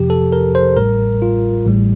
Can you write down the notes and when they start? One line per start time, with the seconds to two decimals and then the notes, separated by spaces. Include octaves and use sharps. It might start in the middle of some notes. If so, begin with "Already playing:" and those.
Already playing: F2 C3 F3 G4
0.10 A4
0.32 A#4
0.55 C5
0.76 A1 A2 G3 A#4
1.22 F4
1.66 A1 A2 G3